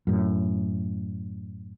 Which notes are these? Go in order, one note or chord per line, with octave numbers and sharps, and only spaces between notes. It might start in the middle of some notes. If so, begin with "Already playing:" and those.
F#2 A2